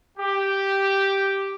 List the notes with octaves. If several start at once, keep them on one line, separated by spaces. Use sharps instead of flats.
G4